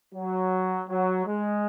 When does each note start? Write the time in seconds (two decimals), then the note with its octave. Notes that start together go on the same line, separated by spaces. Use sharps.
0.15 F#3
0.88 F#3
1.25 G#3